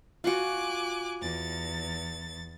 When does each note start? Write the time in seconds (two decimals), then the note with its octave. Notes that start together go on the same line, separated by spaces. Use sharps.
0.24 F4 F#4 G#5 D6 F#6
1.21 E2 A6